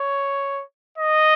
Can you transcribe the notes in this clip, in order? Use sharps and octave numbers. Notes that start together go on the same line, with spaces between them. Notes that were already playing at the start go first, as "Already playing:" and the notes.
Already playing: C#5
D#5